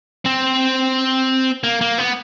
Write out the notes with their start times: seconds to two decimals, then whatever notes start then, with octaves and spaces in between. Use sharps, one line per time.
0.25 C4
1.63 A#3
1.81 A#3
1.99 B3